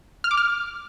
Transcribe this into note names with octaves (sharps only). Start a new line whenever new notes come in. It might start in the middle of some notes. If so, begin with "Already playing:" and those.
F6
D6
F6